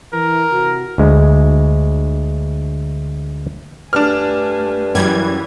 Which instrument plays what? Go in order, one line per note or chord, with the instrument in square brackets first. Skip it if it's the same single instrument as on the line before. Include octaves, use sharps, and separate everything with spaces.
[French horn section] E3 [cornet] A#4
[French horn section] C3 F#4
[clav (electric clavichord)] D2 G#3
[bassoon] G2 [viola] A3 G#5 [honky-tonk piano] D4 F6
[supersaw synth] F#2 G3 G#6 [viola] E3